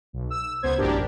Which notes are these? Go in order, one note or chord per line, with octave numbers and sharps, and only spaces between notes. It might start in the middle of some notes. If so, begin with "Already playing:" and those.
B1
E6
C#2 B3 C5 G#6
A1 F#2 D4 G4 A#4